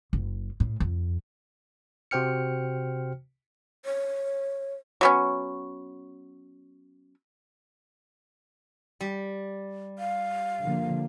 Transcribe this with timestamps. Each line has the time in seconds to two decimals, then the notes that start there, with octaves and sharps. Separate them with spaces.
0.13 F#1
0.60 A2
0.80 F2
2.11 C3 F#4 C5 G5 F6 C#7
3.85 C#5
5.01 F#3 B3 C#4
9.01 G3
9.99 F5
10.62 D3 F3 A#3